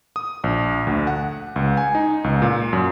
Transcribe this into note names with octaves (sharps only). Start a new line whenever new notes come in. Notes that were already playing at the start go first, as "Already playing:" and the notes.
D#6
A#1
D2
F#5
C#2
G#5
D#4
C#2
A#2
F#2